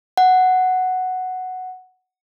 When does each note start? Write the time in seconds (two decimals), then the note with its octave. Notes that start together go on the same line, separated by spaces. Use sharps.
0.17 F#5